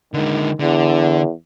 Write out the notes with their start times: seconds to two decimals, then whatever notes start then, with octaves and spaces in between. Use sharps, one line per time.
0.14 D3 D#3 G#3
0.60 E2 D3